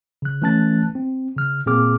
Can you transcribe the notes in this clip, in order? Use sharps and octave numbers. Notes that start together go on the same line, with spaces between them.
C#3 F#6
E3 A3 C#4 A5 F#6 A6
C4
C#3 F6
A#2 A#3 C4 G#4 D6 F6